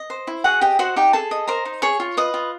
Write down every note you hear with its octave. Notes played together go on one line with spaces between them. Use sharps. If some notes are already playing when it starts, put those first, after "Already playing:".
Already playing: D#5
C5
E4
F#4 G#4 F#5
G4 D#5 G5
F#4 C5 F#5
D#4 G4 G5
G#4 A4 A5
D#5
A#4 C5 A#5
D#4
G#4 C#5 C#6
F4
B4 D#5 D#6
F4